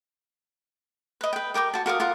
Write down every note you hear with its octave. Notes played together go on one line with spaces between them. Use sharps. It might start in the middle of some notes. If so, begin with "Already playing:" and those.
B4 D#5
B4 G5
G4 A#4 G5 D6
F#4 A5
F#4 A#4 F5 D#6
F4 A#4 F#5